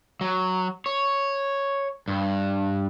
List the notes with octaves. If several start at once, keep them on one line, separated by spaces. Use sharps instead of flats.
F#3
C#5
G2